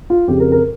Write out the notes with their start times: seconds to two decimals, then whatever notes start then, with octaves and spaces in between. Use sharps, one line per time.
0.10 F4
0.28 F2 C#3 G4
0.40 A#4
0.52 A#4